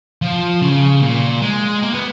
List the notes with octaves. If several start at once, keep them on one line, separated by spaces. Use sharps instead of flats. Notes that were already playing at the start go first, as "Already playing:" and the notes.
F3
C#3
A#2
G#3
A#3
B3